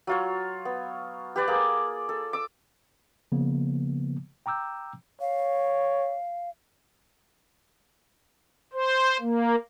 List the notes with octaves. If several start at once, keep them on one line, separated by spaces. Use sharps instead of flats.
F#3 F4 C#5
B3
G4 B4 D5
A#3 G#4
A4
D6 E6
C#3 F3 A#3 B3
G5 A#5 D6 E6 G6
C#5 F5
C5
A#3